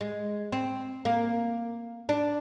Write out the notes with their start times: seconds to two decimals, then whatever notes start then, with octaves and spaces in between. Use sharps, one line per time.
0.01 G#3
0.52 C4
1.05 A#3
2.09 D4